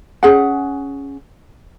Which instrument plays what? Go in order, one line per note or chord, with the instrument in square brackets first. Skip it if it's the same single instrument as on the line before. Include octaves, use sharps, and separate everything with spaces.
[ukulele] C#4 G#4 F#5